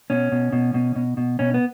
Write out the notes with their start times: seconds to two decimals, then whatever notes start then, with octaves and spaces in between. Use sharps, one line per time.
0.10 B2 C#4
0.32 B2
0.53 B2
0.74 B2
0.96 B2
1.17 B2
1.39 B2 C#4
1.54 B3